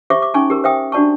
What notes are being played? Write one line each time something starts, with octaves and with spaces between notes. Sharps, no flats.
G4 C5 E5 C#6 D6
D6
C#4 D#4 G#5 C#6
G4 A#4
C5 E5 G5 D#6
D4 F#4 D5 A5 C#6